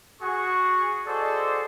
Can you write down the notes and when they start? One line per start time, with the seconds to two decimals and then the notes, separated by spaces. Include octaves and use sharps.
0.20 F#4 G#4 C#6
1.06 F#4 G#4 A4 C5 D5 D#5